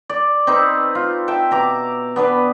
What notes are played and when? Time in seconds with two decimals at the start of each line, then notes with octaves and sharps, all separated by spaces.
0.09 D5
0.47 C4 D#4 B4
0.95 F4
1.28 E5 G5 A5
1.51 B2 A#5 D6
2.16 B3 D4 B4